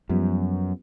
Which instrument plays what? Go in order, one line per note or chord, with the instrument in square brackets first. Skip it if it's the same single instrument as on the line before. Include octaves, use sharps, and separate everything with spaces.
[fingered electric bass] F#2 [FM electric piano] F3 G3 B3